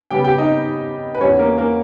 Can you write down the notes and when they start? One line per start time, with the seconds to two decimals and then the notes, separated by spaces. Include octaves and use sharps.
0.10 C#3 G3 B3 G4 G5
0.24 G4 G5
0.38 D#4 D#5
1.15 B4
1.21 E2 D#3 G3 C#4 C#5
1.39 A#3 A#4
1.58 A#3 A#4